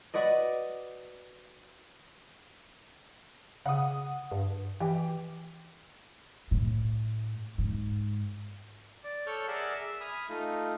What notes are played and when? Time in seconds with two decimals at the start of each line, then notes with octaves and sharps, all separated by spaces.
0.14 F#4 B4 D5 D#5
3.66 C#3 F#5 D#6
4.31 G2
4.80 E3 G4
6.51 A2
7.58 G#2
9.04 D5
9.27 A4 C#5 C#6 F6 G6
9.48 G#4 A#4 D5 E5 F#5
9.74 E5
10.01 G#5 B5 D#6 F6
10.29 A3 D#4 F4